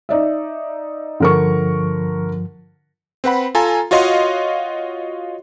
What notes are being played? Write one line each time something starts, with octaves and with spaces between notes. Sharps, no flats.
D#4 D5 E5
G2 D3 F3 A#4 C#6
C4 B4 F#5 B5
F4 A4 G#5 A#5
F4 F#4 C#5 D#5 F5 C6